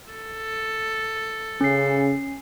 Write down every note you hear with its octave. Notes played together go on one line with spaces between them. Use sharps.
A4
C#3 C#4 C7